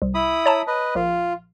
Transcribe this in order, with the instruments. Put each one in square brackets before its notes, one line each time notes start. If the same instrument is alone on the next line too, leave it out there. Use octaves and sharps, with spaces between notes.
[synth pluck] C2
[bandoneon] E4 B5 D#6
[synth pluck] C#5 A5 A#5
[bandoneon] B4 D#5
[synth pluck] A#1 [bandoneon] F4